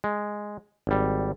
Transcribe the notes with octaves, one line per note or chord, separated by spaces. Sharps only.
G#3
G#1 G3